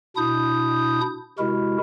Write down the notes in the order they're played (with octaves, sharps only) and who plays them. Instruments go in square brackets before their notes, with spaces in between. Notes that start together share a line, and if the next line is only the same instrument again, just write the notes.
[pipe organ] B2 D4 E4 D#6 G6
C3 G#3 E4 F#4 A#4